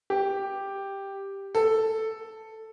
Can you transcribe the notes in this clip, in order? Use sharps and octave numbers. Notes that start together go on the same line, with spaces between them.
G4
A4